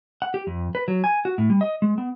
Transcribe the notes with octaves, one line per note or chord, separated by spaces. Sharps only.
F#5
G4
F2
B4
F#3
G#5
F#4
A2
G3
D#5
G#3
B3